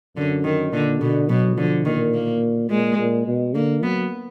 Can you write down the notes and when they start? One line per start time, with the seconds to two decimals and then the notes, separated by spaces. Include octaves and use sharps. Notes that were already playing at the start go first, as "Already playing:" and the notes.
0.16 F#2 D3
0.44 D#3
0.73 A#2 D3
1.00 B2 D3
1.29 B2 F#3
1.57 D3 F3
1.85 A#2 D#3
2.14 A#3
2.70 A#2 G#3
2.98 A#2
3.27 B2
3.55 D3 A#3
3.83 F#3 B3